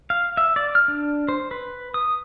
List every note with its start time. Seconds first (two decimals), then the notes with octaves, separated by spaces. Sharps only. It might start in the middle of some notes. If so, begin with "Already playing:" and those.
0.10 F5
0.37 E5
0.56 D5
0.75 F6
0.88 D4
1.29 C5
1.51 B4
1.94 D#6